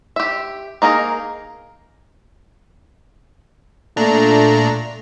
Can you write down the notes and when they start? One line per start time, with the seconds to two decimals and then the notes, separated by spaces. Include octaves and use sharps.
0.16 G4 E5
0.82 A#3 D#4 G#4 A#4
3.97 A#2 A3 D4 A#5